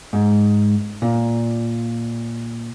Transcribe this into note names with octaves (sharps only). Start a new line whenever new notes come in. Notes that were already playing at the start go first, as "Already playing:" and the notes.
G#2
A#2